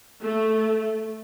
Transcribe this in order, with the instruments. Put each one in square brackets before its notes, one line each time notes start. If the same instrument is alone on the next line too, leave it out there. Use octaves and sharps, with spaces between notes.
[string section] A3